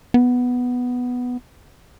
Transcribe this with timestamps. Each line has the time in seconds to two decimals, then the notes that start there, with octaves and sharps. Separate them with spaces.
0.14 B3